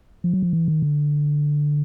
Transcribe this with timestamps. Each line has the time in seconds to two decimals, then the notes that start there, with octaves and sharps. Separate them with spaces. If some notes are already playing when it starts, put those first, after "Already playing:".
0.24 F3
0.34 F#3
0.43 F3
0.53 E3
0.68 D#3
0.82 D3